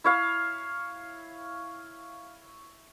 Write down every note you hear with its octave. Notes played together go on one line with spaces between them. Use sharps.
E4 C#5 F5